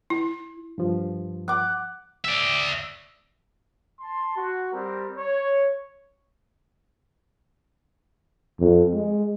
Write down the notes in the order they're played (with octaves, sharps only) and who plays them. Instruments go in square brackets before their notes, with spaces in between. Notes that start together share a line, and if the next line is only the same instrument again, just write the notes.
[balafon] E4
[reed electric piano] G2 F3
[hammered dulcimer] F#5 D6
[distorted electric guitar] D5 E5
[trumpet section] A5 C6
F#4
G3 C4 A#4
C#5
[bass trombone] F2
G#3